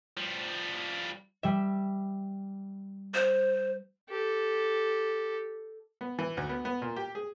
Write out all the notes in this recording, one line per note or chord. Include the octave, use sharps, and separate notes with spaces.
F3 G3
G3 E5
C5
G4 A4
B3
E3
D2
B3
B3
A#2
G4
G#4